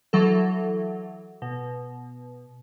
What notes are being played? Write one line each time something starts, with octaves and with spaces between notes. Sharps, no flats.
E3 F#3 A4
B2